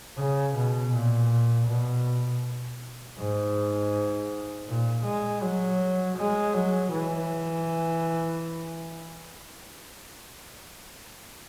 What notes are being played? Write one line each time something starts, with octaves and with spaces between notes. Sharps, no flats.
C#3
B2
A#2
B2
G#2
A#2
G#3
F#3
G#3
F#3
E3